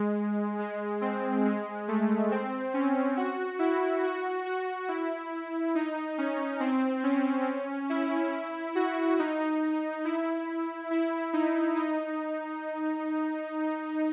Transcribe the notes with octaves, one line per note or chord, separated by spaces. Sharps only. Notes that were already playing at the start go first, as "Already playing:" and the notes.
Already playing: G#3
G#3
C4
G#3
A3
C4
C#4
F#4
E4
F#4
F#4
E4
D#4
C#4
C4
C#4
E4
F#4
D#4
E4
E4
D#4
D#4